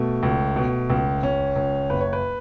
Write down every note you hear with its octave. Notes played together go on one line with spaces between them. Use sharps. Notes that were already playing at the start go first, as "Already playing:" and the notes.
Already playing: B2 A3
C#2
B2
C#2
C#2 C#4
C#2
F#1 B4
C#5
B4